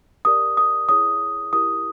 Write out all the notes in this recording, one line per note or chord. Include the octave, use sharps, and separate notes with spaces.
G4 A#4 D5 D#6
D#6
E4 G#4 C#5 D#6
E4 G4 A#4 D#6